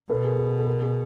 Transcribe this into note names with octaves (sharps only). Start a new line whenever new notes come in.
B2 A4 B4
G#4 A#4
G#4 A#4
A4
G#4 A#4
G#4 A#4